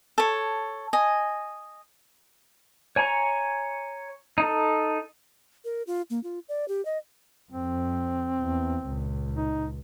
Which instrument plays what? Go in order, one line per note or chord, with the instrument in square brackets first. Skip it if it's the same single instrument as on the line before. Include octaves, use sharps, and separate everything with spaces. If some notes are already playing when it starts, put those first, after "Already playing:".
[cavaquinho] A4 C#5
D#5 G#5
[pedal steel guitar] C#5 G#5 A#5 C#6
D#4 A4
[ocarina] A#4
F4
A#3
F4
D5
G4
D#5
[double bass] F2 [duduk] C4
[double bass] E2
C#2 A#2
[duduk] D#4